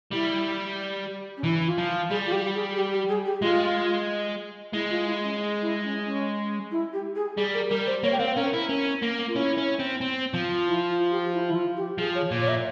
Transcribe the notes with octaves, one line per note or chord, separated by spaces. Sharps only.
G3 E4
C#4
E3 E4
F4
F3
G3 G#4
F4
G4
G#4
G4
G4
G#4
G4
G#3 F4
G#3 E4
F4
E4
C#4
E4
C#4
C#4
E4
G4
G#4
G3 G#4
A#4
G3 A#4
C5
A#3 C#5
G5
C4 F5
C5
C#4 A#4
E4 A#4
C#4
A#3
F4
C#4 E4
C#4
C4
C4
F3
E4
F4
G4
E4
E4
F4
G4
F3 G#4
C#5
A#2
C#5
E5